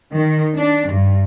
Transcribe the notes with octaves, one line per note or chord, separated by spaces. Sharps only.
D#3
D4
G2